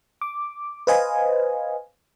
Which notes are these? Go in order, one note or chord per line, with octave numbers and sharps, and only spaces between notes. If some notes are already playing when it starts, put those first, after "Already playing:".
D6
B4 C5 D#5 F5 G#5